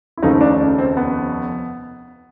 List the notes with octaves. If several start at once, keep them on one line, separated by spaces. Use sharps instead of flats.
E4
F1 D#2 C#3 F3 A3 D#4
D4
C#4
C4
B3